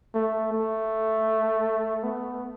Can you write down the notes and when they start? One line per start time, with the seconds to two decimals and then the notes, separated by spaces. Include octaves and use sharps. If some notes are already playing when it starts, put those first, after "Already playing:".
0.15 A3
0.52 A3
2.04 B3